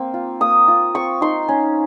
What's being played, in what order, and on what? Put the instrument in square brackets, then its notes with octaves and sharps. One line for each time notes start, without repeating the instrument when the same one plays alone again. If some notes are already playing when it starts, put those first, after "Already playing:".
Already playing: [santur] A#3 C4 G5
F4
A#3 D#6
F4
C4 C#6
D#4 C6
C#4